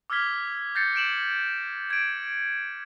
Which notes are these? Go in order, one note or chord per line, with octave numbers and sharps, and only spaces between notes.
D6 E6 F6 G#6 B6 G7
G6 A6 A#6 C7 C#7
G6 D7 E7 F#7
G#6 D7